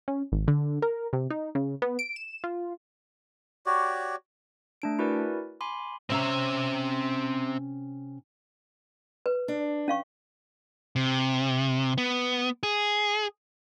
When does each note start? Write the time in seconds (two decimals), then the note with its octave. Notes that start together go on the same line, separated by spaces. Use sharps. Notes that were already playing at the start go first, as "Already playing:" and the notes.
0.08 C#4
0.32 G#1
0.48 D3
0.82 A#4
1.13 C3
1.30 D#4
1.55 C#3
1.82 B3
1.99 D7
2.16 E7
2.44 F4
3.66 F#4 G4 C#5 D5
4.82 A3 D4 D7
4.99 E4 F#4 A#4 B4 D5 G#5
5.61 G#5 B5 C6 D6
6.10 C3 C4 C#4 E5 A#5
9.26 B4
9.48 D4
9.88 C#4 F5 C#6
10.96 C3
11.98 B3
12.63 G#4